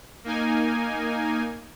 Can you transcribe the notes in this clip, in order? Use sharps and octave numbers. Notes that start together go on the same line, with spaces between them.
A#3 D#4 G#5